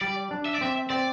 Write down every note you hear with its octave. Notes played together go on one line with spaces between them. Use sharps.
G3 D5
D4
E5
D5
C4 E5
C4 D5